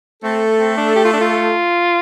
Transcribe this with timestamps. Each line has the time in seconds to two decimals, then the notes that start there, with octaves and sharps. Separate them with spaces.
0.23 A3 C4 A4
0.59 C4
0.77 D4
0.96 G4
1.05 F4
1.13 D4
1.20 F4